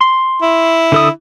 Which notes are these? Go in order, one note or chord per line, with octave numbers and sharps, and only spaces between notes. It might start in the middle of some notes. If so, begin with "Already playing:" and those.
C6
E4
D3 A4 D#6